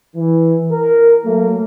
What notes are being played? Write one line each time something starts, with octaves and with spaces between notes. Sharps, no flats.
E3
A#4
F#3 A3 A#3